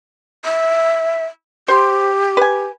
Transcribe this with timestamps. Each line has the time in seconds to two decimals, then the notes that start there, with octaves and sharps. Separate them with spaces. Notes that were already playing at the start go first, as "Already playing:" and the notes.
0.45 E5
1.68 G4 C5 C6
2.37 B4 G#5